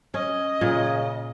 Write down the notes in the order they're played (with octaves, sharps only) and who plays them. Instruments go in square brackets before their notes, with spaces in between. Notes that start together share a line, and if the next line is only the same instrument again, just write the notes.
[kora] C#4 [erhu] D#5
[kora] A#2 [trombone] C#3